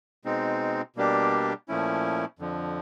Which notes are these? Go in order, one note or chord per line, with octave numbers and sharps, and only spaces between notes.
B2 G#3 C4 D#4
B2 G3 A#3 D4 G4
A#2 F3 A3 C#4 E4
F2 D3 F3